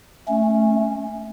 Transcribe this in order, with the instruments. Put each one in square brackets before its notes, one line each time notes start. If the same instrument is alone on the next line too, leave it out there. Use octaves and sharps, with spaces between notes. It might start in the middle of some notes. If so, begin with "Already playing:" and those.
[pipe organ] A3 C#4